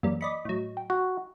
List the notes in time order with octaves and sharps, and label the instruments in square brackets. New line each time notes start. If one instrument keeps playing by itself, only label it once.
[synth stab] F#2 G3 [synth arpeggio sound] E3 A#3
[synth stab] D5 D#5 B5 [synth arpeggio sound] C#7
[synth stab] A2 F#3 [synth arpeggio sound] D#5
[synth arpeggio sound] G5
[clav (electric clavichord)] F#4